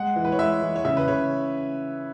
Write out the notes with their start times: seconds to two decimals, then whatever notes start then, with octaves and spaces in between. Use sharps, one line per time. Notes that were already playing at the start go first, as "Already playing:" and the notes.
Already playing: G#3 F#5
0.16 E3
0.25 B4
0.32 C#5
0.39 G#3 E5
0.62 E3
0.76 C#5
0.85 C#3 E5
0.97 B4
1.08 C#3 C#5